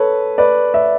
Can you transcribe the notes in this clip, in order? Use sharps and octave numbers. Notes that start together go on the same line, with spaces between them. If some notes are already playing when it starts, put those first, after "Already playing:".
Already playing: A4 B4 C#5
B4 D5
E5